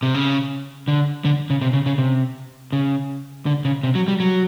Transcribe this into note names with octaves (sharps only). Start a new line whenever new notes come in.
C3
C#3
D3
D3
C#3
C3
C#3
C#3
C3
C#3
D3
C#3
C3
F#3
G3
F#3